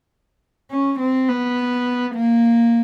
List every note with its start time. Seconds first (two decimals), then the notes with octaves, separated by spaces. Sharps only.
0.70 C#4
0.99 C4
1.28 B3
2.15 A#3